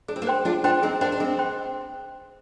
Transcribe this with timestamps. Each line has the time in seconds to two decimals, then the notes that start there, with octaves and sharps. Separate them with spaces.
0.08 D4 G#4
0.16 C4
0.22 A#3 D4
0.27 C5 G5 C6
0.45 D4 F4 G#4
0.64 D4 F4 C5 G5 C6
0.82 C4 D#4 G#4
1.01 A#3 D4 C5 G5 C6
1.12 D4
1.20 G#3 C4 G#4
1.39 C5 G5 C6